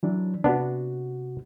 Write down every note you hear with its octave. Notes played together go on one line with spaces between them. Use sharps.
E3 F#3 D4
C3 B3 D4 F#4